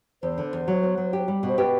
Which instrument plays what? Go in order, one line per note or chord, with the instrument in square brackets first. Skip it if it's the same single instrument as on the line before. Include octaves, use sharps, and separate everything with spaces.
[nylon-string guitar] E2 [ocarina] C5
[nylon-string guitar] D3
E2
F#3
B3
F#3
G4
G3
B2
[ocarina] C5
[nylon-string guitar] G4 [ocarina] B4